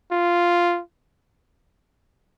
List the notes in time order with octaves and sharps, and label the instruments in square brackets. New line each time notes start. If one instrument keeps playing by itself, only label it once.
[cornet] F4